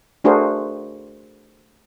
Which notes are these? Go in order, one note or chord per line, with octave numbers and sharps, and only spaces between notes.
A3 D4 F#4 G#4 A#4 C5